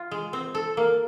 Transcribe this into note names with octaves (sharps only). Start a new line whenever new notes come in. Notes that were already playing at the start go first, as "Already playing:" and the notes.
Already playing: F4
G#3
C4
A4
A#3